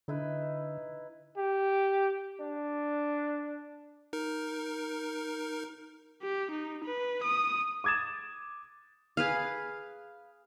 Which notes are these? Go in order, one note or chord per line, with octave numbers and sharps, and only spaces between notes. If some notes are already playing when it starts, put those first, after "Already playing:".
D3 D#4 E4 B4
G4
D4
D#4 A#4
G4
D#4
B4
D#6
D6 D#6 G#6 A6 E7
G#4 B4 F5